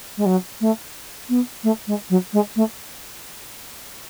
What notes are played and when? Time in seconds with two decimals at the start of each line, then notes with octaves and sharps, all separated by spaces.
0.18 G#3
0.26 F#3
0.61 A3
1.29 B3
1.64 A3
1.87 G#3
2.10 F#3
2.33 G#3
2.56 A3